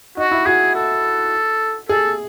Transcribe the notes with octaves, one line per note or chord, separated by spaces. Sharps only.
D#4 F#4
E4
F#4 G#4
A4
G#4 A4